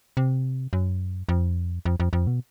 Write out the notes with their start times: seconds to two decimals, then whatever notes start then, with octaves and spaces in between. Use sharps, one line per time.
0.17 C3
0.73 F#2
1.29 F2
1.85 F2
2.00 F2
2.13 F2
2.27 B2